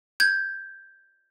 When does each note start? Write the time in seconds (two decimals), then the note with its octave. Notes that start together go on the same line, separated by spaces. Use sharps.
0.20 G6 G#6